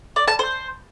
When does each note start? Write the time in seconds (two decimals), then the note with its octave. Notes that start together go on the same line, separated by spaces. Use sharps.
0.16 D5
0.28 A5
0.39 C5